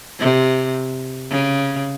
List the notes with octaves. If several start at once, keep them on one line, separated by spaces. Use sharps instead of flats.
C3
C#3